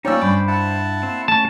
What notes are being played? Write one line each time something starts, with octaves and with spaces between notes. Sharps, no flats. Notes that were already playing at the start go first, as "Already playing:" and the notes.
A#3 C#4 D#4 F4 C#5 D5 G5 E6
G2 C5 B5 D6
E4 F#5 A5
A#3 C4
A3 C#4 A5